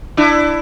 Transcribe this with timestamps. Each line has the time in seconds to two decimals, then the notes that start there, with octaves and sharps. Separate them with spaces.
0.17 D4 E4